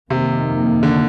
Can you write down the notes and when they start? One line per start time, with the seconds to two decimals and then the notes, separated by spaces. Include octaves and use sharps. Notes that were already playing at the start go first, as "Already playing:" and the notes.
0.10 F2 C3 D#3 A#3
0.83 D3